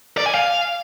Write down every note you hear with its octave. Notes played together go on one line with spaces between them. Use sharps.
D5
G#5
F5